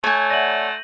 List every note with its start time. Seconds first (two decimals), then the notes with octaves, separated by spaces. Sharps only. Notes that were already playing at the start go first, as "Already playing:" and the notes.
0.04 A3 C#5 G#5 G6 D#7
0.30 D5 E5 F#5 A#6 D#7 F#7